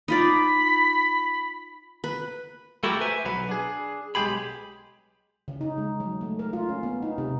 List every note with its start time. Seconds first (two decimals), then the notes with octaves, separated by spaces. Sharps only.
0.08 D#4 F4 D5 B5
2.04 B4
2.84 A3 E4 F#4 G4 A4 A#4
3.01 B4 C5 E5 G#5
3.25 B1 F#3 B4
3.49 D4 G#4
4.15 B1 G#3 G4 G#4 B5
5.48 C#3
5.61 D#4
5.78 G#3
6.00 F#3
6.21 A3
6.39 A#4
6.53 F4
6.69 C#4
6.83 B3
7.03 D#4
7.18 C3